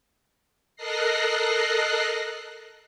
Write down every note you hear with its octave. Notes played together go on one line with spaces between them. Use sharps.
A4 A#4 D#5 F#6 A#6 C7